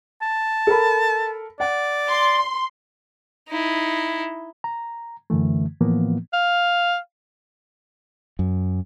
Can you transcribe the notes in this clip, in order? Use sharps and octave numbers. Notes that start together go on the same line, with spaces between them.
A5
A4 A#4 B5
D5 F#5
C6
D#4 E4
A#5
F#2 D3 E3 A3
A2 E3 F3 A#3 B3
F5
F#2